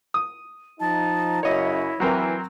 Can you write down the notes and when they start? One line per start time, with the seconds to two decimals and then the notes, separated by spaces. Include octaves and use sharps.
0.14 D#6
0.80 F3 D#4 A5
1.43 F#2 C#3 E4 C#5 D#5
2.00 E3 F#3 C4 A#4